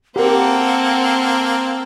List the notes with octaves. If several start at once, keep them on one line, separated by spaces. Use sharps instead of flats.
A#3 C4 G4 A4 A#4 F#5